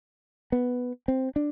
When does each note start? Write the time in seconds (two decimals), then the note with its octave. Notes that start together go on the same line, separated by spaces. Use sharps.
0.52 B3
1.08 C4
1.36 D4